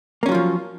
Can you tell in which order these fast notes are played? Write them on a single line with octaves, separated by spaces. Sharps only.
A#3 C#4 F#3 F4 F3